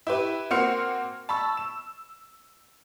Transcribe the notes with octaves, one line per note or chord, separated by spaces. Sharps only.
E4 G4 B4
A#3 C4 F#4 C6 F6 C#7
A5 B5 C#6 E6
E7